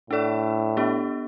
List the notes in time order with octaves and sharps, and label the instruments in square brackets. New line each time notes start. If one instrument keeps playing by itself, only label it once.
[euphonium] A2 [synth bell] D4 A4 D5
[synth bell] B3 D4 G4